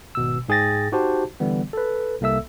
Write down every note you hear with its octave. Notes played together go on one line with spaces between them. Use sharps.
G#1 B2 E6
G#2 G#4 G5 A6 A#6
D#4 F#4 G4 C5 A5
D3 E3 G3 B3
A4 B4
C2 A#3 A4 E5 E6